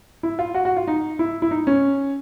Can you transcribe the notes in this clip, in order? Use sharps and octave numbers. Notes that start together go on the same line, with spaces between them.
E4
F4
F#4
F#4
F4
D#4
E4
E4
D#4
C#4